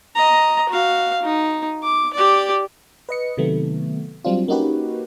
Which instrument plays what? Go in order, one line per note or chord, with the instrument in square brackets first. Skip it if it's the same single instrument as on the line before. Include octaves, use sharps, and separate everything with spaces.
[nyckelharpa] D#5 A#5
F#4 F5
D#4
D6
G4 D5
[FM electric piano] B4 D#5 C#7
C3 D#3 F#3 A3 B3
F#3 G3 C4 D4 F4
A#3 C#4 D#4 F#4 G4 B4